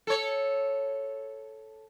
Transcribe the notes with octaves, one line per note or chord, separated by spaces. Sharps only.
A4 C#5